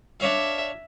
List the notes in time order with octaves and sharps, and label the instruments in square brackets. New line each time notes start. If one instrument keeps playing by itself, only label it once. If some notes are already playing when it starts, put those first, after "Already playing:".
[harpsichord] D4 C#5 F5 [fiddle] E5